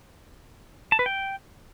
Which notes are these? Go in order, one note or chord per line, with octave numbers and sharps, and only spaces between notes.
A5
B4
G5